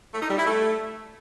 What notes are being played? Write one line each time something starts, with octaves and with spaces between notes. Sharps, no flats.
A3
D#4
G3
E4
A3